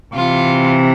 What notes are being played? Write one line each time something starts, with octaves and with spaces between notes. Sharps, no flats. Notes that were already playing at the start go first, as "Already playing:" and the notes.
C3 E3 F4